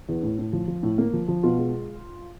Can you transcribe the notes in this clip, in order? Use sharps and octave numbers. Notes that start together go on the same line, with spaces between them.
E2
A2
A2
F3
F3
A2
A#3
F3
F3
B2 F4
G#3